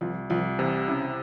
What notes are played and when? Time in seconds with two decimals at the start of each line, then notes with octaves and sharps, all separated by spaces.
0.01 C2 F3
0.30 C2 F3
0.59 C3 E3
0.88 C#3 E4